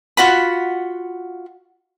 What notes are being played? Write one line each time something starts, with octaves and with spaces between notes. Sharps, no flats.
F4 F#4 F#5 B5